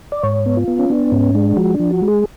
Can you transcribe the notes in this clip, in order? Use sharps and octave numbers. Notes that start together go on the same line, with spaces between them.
D5
G#2 C#5
B3
F4
B3
C#4
B3 D4
G#2 C#4
G#3 D4
F3 F#4
D4
F3
F#4
G#3
G#4